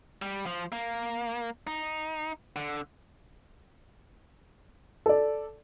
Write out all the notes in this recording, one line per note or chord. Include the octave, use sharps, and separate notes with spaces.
G3
F3
A#3
D#4
D3
A4 D5